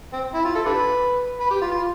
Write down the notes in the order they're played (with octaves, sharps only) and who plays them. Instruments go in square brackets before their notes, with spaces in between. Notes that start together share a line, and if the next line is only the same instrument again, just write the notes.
[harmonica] C4
E4
F4
A4
D4 G4 B4
B4
G4
F4
F4